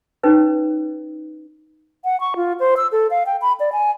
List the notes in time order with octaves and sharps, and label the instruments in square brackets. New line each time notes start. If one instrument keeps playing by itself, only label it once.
[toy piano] C#4 D#4 B4 C#5
[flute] F#5
C#6
F4
C5
E6
A4
F5
G5
B5
D5
G#5